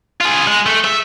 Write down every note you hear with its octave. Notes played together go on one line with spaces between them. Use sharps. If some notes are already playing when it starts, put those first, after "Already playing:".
F4 G#4
G#3
A3
E5